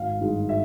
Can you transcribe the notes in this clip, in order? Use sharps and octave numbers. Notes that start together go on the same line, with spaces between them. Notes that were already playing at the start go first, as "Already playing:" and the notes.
Already playing: G#1 F5
G2 D#3 G#3
E5